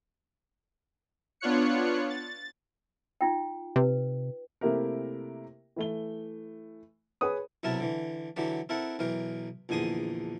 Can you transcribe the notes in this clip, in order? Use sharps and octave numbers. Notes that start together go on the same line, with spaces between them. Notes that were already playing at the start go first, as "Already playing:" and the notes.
B3 D4 F4 C#5 F#6 C#7
A6
D#4 F4 G5
C3 B4
C3 A3 A#3 E4 G4 A#4
E3 A3 G7
G#4 B4 C#5 D#6
B1 C3 F#3 E4 A#4 A5
D3 E3
D3 E3 F#3 G4
C4 E4 A4 A#4 F#5
B1 E3 A#4 G5
A#1 E2 D3 G#5 C6 D#6